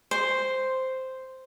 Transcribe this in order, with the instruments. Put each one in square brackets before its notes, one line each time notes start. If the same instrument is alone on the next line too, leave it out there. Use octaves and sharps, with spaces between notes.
[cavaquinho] C5